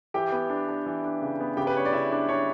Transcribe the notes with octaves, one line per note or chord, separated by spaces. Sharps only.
E3 G4 G5
B3
D4
D4
E3
D4
C#3
B3
C#3 G4 G5
B4
D4 C#5
D5
C#3 E4 E5
D4
D4 C#5